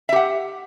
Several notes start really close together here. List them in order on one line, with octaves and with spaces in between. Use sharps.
E5 G4 F#5